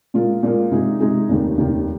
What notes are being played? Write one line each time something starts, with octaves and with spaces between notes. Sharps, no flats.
A#2 G#3 F4 A#4
A#2 G#3 F4 A#4
C3 G#3 D#4 G#4
C3 G#3 D#4 G#4
F1 D#2 D#3
F1 D#2 D#3